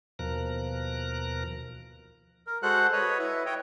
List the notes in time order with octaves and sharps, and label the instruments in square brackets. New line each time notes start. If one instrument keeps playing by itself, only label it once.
[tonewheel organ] D#2 B2 F3 A#4 A#5 F#6
[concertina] A#4
G#3 F#4 A4 C5 F#5 F#6
B4 C#5 D#5
E4 B4
C#5 D#5 G5